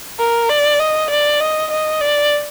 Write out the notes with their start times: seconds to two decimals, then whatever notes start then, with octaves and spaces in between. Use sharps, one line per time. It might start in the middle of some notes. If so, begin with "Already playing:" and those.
0.19 A#4
0.49 D5
0.79 D#5
1.10 D5
1.40 D#5
1.71 D#5
2.01 D5